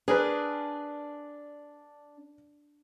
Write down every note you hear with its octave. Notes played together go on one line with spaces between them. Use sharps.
D4 G#4 A#4 B4